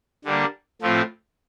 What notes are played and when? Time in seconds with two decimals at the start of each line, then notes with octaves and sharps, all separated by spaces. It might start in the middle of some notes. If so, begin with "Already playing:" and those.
0.25 D3 G3 A#3 D4
0.82 A2 F3 A3 C4 F4